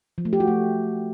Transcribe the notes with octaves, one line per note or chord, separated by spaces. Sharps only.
F3
A3
G4
F#4
A3